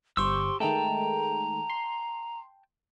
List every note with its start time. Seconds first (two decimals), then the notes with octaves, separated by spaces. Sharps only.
0.17 G1 G4 C5 C6 C#6 E6
0.60 D#3 G#3 A3 G5 A5 A#5
1.70 C6